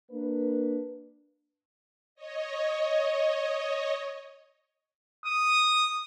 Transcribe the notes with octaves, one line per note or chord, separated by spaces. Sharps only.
A#3 D4 B4
C#5 D#5
D#6